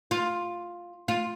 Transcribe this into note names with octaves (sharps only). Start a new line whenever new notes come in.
F4
F4